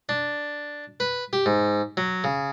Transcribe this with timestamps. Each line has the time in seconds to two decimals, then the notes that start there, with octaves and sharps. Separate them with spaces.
0.09 D4
1.00 B4
1.33 G4
1.46 G#2
1.97 F#3
2.24 C#3